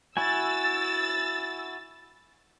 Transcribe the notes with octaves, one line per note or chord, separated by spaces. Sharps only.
E4 F#4 G#5 E6 A6